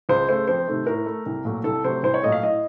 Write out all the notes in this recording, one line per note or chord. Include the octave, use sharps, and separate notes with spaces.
C#2 C5
C#3 A3 C5
F2 C5
C3 D#3 A3
A2 A#4
A3
C2
A#2 F#3 A3
C2 A4
C3 F#3 A3 C5
C2 C5
C#5
A#2 F#3 A3 D#5
F5
A2 D#5